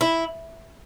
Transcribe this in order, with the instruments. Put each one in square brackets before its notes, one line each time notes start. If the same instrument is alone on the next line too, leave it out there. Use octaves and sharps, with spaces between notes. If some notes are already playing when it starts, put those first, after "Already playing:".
[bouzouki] E4